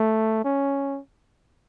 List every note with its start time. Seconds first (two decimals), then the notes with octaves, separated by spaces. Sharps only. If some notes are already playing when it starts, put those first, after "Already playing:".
Already playing: A3
0.44 C#4